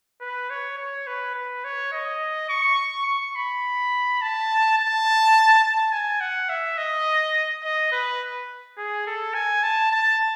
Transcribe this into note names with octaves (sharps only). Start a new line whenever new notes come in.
B4
C#5
C#5
B4
B4
C#5
D#5
C#6
C#6
B5
A5
A5
A5
G#5
F#5
E5
D#5
D#5
B4
G#4
A4
G#5
A5
A5